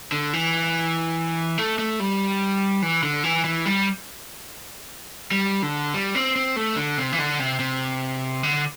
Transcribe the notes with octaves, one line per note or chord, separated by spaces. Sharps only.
D3
E3
A3
A3
G3
E3
D3
E3
E3
G3
G3
D3
G3
C4
C4
A3
D3
C3
E3
D3
C3
C3
D3